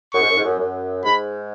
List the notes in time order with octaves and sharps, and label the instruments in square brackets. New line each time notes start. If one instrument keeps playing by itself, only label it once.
[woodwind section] F#2 [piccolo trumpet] C#6
[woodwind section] G#2
F#2
G#2
F#2
F#2
[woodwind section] G#2 [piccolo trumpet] B5